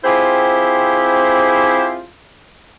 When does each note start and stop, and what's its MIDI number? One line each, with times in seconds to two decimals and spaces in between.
0.04 2.02 60
0.04 2.02 64
0.04 2.02 65
0.04 2.02 67
0.04 2.02 68
0.04 2.02 72